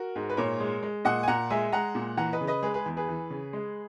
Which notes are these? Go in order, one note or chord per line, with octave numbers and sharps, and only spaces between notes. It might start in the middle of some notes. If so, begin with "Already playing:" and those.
Already playing: F#4 A#4
G#2
B4
A#2 A#4 C#5
G#3
G#3
A#2 D#5 F#5
G#5
A#2 F#5 A#5
G#3 E5 G#5
G#3 F#5 A#5
A#2
E3 F#5 A#5
B4 D#5
C#3
B4 D#5
G#3 G#4 B4
G#4 B4
E2
G#4 B4
E3
C#3
G#3